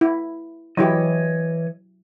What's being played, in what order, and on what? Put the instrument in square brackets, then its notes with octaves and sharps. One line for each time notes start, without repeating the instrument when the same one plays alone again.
[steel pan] E4
[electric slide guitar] E3 C#5 D#5 [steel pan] F#3 E4 G4